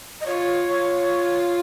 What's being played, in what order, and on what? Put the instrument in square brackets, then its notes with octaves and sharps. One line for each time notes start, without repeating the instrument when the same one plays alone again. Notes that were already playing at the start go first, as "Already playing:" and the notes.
[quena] D#5
[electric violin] F4 [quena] C#5
[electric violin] F4